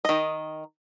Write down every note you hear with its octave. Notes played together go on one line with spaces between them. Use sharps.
D#3 D#5